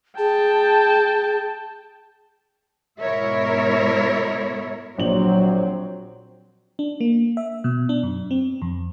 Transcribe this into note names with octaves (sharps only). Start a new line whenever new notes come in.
G#4 G5 A5
G#2 B2 E4 A#4 C#5 E5
A#1 F#3 C4 F#7
D4
A#3
E5
B2
D4
F#2
C4
F2